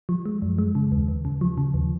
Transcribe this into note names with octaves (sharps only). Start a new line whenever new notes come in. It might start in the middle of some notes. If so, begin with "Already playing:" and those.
F3
G#3
F#2
G#3
C#3
D#2
D#2
C#3
F3
C#3
D#2